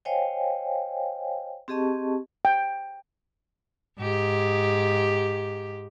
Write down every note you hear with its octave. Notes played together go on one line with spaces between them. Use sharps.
C5 C#5 D#5 F5 G5 G#5
C4 G4 G#4 D#5 A5 C#6
G5
G#2 G4